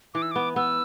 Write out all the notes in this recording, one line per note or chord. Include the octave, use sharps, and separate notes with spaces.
E3 D6
E6
B3 D6
B3 E6